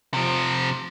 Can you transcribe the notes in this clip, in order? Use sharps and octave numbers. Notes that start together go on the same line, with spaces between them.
C3 F3